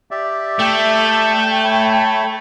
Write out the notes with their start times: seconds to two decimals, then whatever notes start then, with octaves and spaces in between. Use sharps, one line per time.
0.11 G4 D5 E5
0.60 A3 G5
1.65 C#5 B5